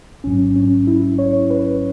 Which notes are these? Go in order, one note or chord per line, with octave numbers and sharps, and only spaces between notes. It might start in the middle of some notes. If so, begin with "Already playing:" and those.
A1 G#2 F#3 C#4
C#4
E4
C#5
B4